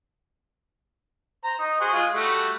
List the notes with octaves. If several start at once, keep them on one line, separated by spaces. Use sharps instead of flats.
C5 A#5
D#4
F#4 G#4 C5
G#3 F4 G#4
G3 A3 F#4